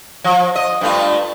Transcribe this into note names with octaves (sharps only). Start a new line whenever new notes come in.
F3
D#5
G2 A3 F4